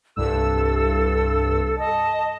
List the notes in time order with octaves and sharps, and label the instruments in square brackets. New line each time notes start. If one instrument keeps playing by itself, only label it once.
[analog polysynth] C2 G2 E6 [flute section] A4
[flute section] D#5 A5 D#6